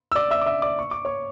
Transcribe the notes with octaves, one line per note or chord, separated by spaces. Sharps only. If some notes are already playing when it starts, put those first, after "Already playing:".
E6
D5 D6
E5 E6
D6
E5 E6
D5 D6
C#6
D6
C#5 C#6